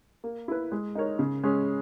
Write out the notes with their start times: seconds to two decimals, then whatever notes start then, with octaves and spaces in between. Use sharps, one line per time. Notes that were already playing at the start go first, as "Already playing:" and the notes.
0.24 A#3
0.48 E4 B4
0.72 G#3
0.95 D#4 A#4 C#5
1.19 C#3
1.43 G#3 C#4 G#4